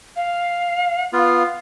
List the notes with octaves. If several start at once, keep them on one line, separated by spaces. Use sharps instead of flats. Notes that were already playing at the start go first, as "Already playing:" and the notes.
F5
B3 F4 F5